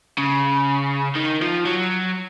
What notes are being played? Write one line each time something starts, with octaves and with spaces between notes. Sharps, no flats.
C#3
D#3
F3
F#3